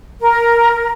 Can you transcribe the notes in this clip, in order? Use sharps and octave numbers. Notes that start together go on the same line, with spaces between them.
A#4